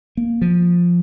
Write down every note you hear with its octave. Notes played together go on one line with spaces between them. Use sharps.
A#3
F3